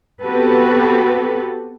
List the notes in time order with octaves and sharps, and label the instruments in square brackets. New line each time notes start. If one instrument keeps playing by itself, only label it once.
[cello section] B3 C4 F#4 G4 A4 B4